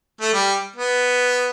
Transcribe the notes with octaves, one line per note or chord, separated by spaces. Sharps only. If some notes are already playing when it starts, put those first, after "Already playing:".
A3
G3
B3